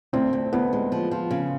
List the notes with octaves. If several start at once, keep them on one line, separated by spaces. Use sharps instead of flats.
D2 C4
D2
D2 B3
G#3
F3
F3
C#3